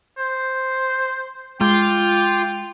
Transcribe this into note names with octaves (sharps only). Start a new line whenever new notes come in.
C5
G#3 F4 G5 D6